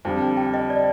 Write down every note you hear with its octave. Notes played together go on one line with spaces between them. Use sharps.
F2 D3 G3
G5
D#5
D5